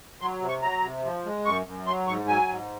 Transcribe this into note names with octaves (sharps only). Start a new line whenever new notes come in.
F#3 C6
C3
C#6
F#3 A#5
C3
F3
G#3
F#2 C#6
F#2
F#3 C6
G#2 C#6
F#3 G#5
G#2